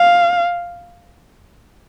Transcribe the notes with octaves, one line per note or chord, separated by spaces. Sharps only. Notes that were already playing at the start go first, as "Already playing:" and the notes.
Already playing: F5